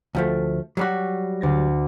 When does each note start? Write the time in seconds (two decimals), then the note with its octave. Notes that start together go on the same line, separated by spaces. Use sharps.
0.15 D2 F3 A3
0.77 F#3 G3 F#4
1.41 D2 A6 A#6